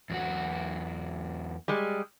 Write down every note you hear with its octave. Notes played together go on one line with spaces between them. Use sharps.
E2 F#3 F#4
G3 G#3